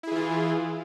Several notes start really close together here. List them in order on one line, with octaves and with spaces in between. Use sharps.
E4 G#4 E3 F4